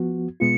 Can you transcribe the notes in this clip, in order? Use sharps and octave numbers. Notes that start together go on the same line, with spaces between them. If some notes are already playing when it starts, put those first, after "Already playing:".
Already playing: F3 B3 F#4
B2 G#3 B3 F4 C#7